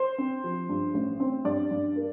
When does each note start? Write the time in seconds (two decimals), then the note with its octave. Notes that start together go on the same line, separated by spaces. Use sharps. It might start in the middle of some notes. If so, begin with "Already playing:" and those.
Already playing: C5
0.18 C4
0.44 F3
0.69 G2
0.94 A1
1.20 C4
1.44 G2 D5
1.71 G2
1.96 A#3